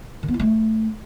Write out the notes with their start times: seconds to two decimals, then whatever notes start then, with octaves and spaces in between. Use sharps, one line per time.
0.23 D#3
0.28 B3
0.34 E4
0.40 A3